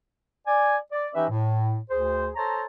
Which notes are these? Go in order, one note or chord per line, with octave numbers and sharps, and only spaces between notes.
D5 G#5
D5
E3 C#4 D#4 G4 B4 E5
A2
D2 G#4 C5
A4 C5 C#5 A5 A#5